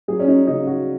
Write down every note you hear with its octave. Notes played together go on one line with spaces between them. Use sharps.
F#3 G#4
C#4
D#4
C#3 D#4
F#4